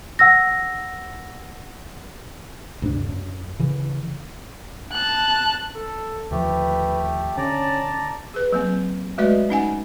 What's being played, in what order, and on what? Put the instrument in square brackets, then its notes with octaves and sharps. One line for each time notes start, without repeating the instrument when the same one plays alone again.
[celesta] F#5 E6 A#6
[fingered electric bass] D2 G2 C3 D4
F#2
C#3 E3
[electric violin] A5 F#6
[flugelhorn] A4
[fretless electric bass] D#2 D3 F3 [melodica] A3 G4 [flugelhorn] B4
[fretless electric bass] D3 [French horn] C#4 [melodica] D5 A#5 [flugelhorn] A5
[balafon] G#4 B4
F#3 A#3 C4
G#3 A3 F#4 B4 D5 D#5
C#4 D#4 F#5 G#5